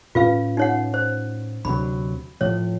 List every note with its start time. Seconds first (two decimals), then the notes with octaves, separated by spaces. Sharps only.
0.15 A2 C#4 F4 B4 F5
0.57 D#4 C#5 F#5
0.94 C5
1.65 D2 C3 F#3 B5
2.41 A2 F3 C#5